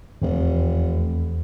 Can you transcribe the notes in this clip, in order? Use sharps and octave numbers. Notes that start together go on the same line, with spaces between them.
F1 E2